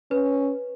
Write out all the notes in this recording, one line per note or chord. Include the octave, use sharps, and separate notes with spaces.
C#4 B4